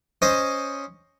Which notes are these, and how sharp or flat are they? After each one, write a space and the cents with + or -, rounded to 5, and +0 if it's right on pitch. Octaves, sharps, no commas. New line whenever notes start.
C#4 +0 C5 +0 D#5 +0